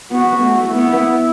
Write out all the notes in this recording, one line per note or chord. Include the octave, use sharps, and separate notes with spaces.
B3 F#4
A3
E4
B3